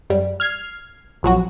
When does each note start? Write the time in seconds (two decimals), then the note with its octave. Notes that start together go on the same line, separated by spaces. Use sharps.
0.10 F#2 G3
0.40 F6 G#6 C7
1.23 A#1 F2 F#3 F#4